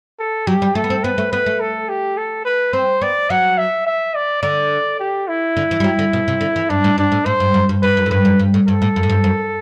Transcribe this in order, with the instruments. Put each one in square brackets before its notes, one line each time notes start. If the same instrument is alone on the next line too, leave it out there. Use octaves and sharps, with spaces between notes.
[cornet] A4
[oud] F#3 [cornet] G4
[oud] G3
[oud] A3 [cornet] A4
[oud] B3
C4
[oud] B3 [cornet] B4
[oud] A3
[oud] B3 [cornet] B4
[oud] A3
[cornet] A4
G4
A4
B4
[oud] C4 [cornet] C5
[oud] B3 [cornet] D5
[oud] F#3 [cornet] F#5
[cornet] E5
E5
D5
[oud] D3 [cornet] D5
[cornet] G4
E4
[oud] D3
E3
G3
F#3
D3
B2
C3
D3
E3
[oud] G2 [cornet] D4
[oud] A2
[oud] G2 [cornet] D4
[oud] A2
[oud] A2 [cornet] C5
[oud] G2
F#2
G2
[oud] G2 [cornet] B4
[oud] F#2
A2
[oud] G2 [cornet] B4
[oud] F#2
G2
A2
[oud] G2 [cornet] A4
[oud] A2
F#2
A2
G2
F#2